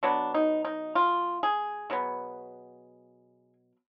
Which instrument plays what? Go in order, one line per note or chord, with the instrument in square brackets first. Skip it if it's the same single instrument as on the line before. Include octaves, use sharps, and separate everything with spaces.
[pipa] B2 F#3 B3 D4
D#4
D#4
F4
G#4
B2 F#3 B3